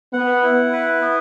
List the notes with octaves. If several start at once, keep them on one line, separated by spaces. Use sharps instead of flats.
B3 F#5
E4
B4
B3